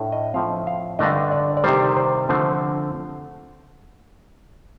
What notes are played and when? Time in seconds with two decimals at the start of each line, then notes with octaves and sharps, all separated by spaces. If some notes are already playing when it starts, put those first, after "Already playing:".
Already playing: A2 A3 D4
0.12 D#5
0.34 A2 F3 C4 F5
0.67 F5
0.99 G2 D3 A3 D4 D#5
1.31 D5
1.57 D5
1.64 C3 D#3 G3 C5
1.97 C5
2.29 D3 F3 A3 C4 C5